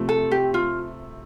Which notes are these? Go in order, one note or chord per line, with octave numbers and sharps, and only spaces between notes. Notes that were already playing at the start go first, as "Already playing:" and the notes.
Already playing: C3 F3 A3 C4
A4
G4
F4